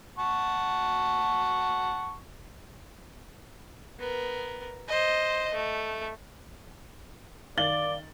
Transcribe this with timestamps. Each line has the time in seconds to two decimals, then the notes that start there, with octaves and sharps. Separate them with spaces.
0.18 F#5 A5 C#6
3.99 B3 A#4
4.88 C5 D#5
5.53 A3
7.58 D#3 D5 F5 A6 F#7 G7